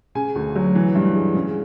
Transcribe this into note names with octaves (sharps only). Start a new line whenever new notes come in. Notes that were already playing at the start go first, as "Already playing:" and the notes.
C#3 G#5
D2
F#3
E3
G2
G#3
C#3